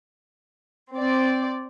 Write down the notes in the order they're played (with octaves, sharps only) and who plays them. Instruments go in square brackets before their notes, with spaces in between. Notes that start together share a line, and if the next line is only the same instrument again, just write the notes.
[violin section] C4 D5